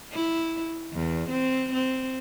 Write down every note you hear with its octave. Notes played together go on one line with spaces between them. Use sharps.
E4
E2
C4
C4